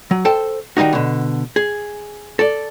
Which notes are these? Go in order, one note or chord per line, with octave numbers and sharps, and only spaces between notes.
F#3
A4 C5 G5 A5
D#3 E3 G3 D#4 F#4
B2 D3
G#4
A4 D5